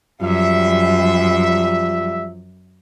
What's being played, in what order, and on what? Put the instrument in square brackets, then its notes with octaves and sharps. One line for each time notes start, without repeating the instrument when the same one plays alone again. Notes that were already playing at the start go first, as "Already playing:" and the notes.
[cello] F#2 [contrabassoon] F3 [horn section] G3 E5